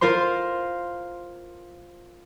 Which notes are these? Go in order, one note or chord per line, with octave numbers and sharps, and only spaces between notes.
F4 A#4 C5 C6